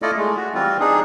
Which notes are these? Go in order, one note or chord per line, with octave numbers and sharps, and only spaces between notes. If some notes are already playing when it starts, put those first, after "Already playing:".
A3 E4 F4 A4 D5 D#5
G#3 A3
F#4
E3 G3 C4 F4
D4 D#4 G#4